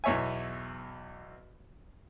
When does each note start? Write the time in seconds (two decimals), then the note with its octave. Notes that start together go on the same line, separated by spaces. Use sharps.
0.04 B1 E2 C#5 E5 G#5